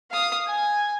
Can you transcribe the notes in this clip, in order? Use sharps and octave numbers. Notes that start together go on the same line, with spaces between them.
F5 D#6
G#5